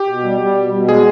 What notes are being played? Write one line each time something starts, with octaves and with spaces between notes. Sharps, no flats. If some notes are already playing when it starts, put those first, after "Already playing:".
Already playing: G4
B2
G3
G3
B2
B2
G#3 G#4